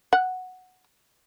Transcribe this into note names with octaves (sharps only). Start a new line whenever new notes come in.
F#5